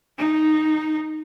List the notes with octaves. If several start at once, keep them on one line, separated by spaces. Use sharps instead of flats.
D#4